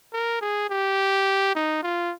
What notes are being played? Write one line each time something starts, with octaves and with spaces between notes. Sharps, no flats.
A#4
G#4
G4
D#4
F4